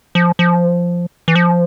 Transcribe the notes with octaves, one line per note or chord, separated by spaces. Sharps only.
F3
F3
E3
F3